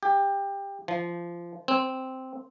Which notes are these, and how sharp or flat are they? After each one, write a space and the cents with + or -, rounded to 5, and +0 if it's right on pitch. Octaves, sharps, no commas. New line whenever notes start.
G4 +20
F3 -20
C4 -5